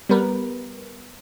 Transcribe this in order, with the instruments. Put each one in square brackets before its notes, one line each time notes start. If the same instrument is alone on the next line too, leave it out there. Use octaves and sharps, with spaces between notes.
[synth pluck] G3 B3 A#4 B4